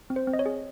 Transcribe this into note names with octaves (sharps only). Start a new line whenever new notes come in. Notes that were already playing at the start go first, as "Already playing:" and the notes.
C4
C5
C4
D#5
C#5
G#4